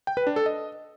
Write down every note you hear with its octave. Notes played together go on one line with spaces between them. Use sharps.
G5
B4
D4
A4
D#5